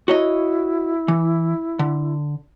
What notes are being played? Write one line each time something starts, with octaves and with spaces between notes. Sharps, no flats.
E4 F#4 C#5 D#5
E3
D3